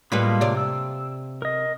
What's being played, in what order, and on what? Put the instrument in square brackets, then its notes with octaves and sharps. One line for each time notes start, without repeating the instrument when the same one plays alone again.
[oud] A2 G3 B4 [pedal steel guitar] G#3 A#3 F4
[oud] C3 D5
[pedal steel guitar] E6
A#4 D#5